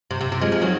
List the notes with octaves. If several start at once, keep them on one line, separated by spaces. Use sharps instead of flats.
C3
C3
C3
F3 G#3
F3 G#3
D#3 F#3